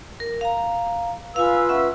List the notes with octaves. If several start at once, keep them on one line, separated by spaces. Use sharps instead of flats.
A#4
F5 A#5
F4 B4 F5 G#5 E6
C#4 E5 F#5